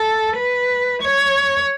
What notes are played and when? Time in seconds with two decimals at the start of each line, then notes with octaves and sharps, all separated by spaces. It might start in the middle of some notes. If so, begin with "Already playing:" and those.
Already playing: A4
0.37 B4
1.02 C#5